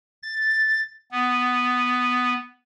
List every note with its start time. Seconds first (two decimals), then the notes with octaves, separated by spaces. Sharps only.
0.23 A6
1.11 B3